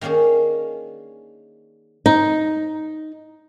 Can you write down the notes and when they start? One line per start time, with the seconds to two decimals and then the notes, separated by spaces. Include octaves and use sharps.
0.01 D#3 A#3 C#4 D4 G#4
2.06 D#4